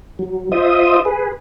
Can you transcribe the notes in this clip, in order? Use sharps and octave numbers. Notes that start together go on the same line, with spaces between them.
F#3
F4 C5 D#5 E5 D#6
G#4 B4